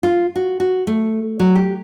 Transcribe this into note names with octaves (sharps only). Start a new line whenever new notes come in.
F4
F#4
F#4
A3
F#3
G4